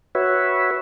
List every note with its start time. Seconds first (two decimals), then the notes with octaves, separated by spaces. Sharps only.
0.15 F#4 B4 C#5 E5